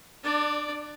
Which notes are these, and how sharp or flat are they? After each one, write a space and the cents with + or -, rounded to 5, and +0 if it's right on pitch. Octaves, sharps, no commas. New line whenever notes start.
D4 +25 D5 +0